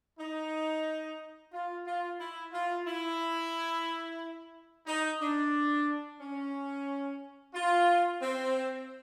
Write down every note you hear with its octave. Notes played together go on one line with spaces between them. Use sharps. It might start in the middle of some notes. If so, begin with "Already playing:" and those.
D#4
F4
F4
E4
F4
E4
D#4
D4
C#4
F4
C4